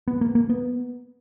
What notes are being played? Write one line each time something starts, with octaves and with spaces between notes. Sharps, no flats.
B3
A#3
A#3
B3